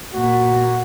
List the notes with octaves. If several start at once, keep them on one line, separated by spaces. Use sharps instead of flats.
A#2 F#4